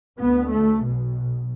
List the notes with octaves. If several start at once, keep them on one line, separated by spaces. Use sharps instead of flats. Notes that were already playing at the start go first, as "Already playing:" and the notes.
D2 B3
A3
B1 B2